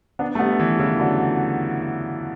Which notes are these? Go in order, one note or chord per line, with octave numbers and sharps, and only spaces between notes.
B3 D4
A3
G3 B3
E3 G3
C#3 E3
D3 F#3